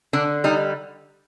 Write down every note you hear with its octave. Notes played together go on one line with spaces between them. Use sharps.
D3 D4
G3 D#4